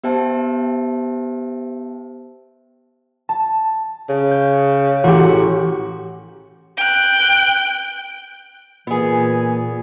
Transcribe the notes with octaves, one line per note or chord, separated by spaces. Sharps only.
B3 G4 C5 E5 G5 A5
A5
C#3
G6
A1 F#4 G4
G5 F#6
A#2 E3 B3 G#4